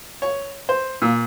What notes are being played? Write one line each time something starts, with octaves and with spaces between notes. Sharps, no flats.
C#5
C5
A#2